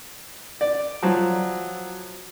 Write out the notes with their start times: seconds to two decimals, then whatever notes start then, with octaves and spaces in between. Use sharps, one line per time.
0.61 D5
1.03 F3 F#3